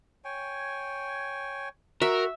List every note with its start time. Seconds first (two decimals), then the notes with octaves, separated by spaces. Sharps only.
0.25 C#5 G5 G#5
2.02 F#4 A#4 E5